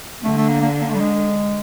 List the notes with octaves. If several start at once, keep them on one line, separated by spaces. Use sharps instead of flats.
D3 A3
A3
A#3
A#3
A#3
A3
G3
G#3